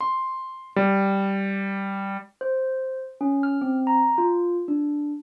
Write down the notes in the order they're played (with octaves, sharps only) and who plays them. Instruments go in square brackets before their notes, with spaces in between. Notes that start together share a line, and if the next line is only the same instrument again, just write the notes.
[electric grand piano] C6
G3
[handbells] C5
C#4
F6
C4
A#5
F4
D4